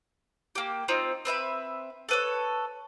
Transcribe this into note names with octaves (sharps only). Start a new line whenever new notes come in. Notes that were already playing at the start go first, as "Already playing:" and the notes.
A#3 G4
C4 D#4 F4
C4 B4 E5 B5
A4 B4 C#5